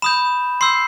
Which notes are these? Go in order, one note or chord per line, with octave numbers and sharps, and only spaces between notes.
B5 D#6 G6 E7
C6 E6 G6 C7